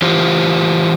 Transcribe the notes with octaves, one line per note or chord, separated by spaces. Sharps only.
E3 F4 G4 C5